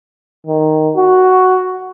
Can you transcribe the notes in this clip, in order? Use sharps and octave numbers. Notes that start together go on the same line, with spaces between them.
D#3
F#4